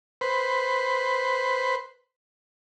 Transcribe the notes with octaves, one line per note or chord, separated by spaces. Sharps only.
B4 C5